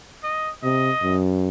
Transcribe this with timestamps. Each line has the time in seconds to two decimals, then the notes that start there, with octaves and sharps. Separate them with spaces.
0.24 D#5
0.63 C3 D#5
1.02 F#2